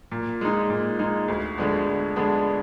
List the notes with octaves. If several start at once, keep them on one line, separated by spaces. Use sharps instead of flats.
A#2
G#3 D#4
A#2
G#3 D#4
D2
D3 G#3 B3 D4
D2
D3 G#3 B3 D4